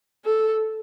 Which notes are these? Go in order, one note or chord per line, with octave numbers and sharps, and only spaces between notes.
A4